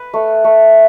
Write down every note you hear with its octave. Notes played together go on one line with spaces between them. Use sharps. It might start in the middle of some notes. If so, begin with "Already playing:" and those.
Already playing: B4
A3
A3